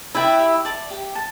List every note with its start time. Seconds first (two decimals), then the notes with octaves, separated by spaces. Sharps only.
0.14 E4 B4 D5 G5
0.39 G4
0.65 D5 A5
0.90 G4
1.15 A5